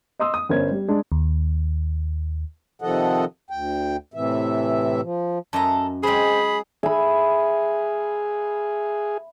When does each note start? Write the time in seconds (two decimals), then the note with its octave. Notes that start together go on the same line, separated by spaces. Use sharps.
0.20 D#5 C6 D#6 E6
0.34 D#6
0.49 G1 C#4 A#4 C5 G#6
0.71 G3
0.88 G#3 D4
1.12 D#2
2.82 C3 D#3 F3 A4 D#5 F#5
3.51 D2 G5
4.14 A2 C3 E3 E5
5.01 F3
5.53 F#2 A4 D#5 E5 A#5
6.03 F#3 G#3 C4 G#4 C5 B5
6.83 G#4 E5 B5